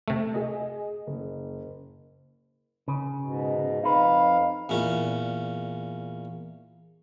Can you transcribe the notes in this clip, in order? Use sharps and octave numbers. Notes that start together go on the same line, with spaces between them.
C3 A3
G#4 D#5
F#1
C#3
G#2 B2
F2 D#4 B4 F5
E2 A#2 C#4